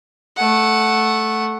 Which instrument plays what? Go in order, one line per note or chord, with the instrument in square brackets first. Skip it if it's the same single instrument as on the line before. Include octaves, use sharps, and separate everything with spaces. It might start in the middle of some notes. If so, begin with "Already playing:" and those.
[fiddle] A3 F#5